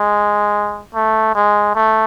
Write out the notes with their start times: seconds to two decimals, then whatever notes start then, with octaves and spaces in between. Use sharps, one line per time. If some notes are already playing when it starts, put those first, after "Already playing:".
Already playing: G#3
0.95 A3
1.35 G#3
1.75 A3